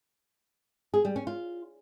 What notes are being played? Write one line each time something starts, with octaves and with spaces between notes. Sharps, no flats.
G#4
G3
C#4
F4